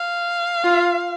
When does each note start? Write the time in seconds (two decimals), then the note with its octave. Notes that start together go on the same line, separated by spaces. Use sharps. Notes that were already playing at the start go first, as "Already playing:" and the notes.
Already playing: F5
0.64 F4